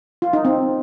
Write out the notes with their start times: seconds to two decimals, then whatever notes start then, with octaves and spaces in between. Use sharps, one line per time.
0.22 F4
0.33 D#4
0.45 C4